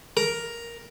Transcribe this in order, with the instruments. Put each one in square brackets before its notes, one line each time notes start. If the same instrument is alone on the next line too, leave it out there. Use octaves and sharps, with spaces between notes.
[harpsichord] A#4